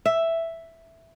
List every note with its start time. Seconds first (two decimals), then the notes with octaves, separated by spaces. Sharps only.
0.06 E5